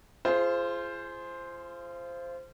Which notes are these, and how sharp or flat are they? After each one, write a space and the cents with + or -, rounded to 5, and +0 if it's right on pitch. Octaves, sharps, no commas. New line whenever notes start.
F4 -30 G#4 +20 C5 +0